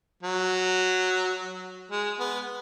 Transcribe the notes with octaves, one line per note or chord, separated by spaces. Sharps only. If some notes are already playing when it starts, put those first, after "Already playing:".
F#3
G#3
B3